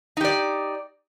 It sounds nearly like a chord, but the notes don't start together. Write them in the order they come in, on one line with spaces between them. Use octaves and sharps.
D#4 G4 D5